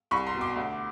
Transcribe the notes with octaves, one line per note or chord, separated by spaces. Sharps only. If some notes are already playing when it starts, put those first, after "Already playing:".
C2 B5 C#6
A#5 C6
B2
C6 D6
D2